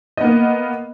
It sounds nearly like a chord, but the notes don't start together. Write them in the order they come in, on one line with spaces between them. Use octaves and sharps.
D#5 B3 A#3